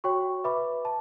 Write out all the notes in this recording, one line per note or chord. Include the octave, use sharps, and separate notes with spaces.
F#4 C#5 G5 C#6
B4 E5 B5 D6
A5